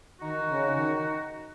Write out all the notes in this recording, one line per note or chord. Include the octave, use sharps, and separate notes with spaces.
D#3 D#4 F#4
C#3
D#3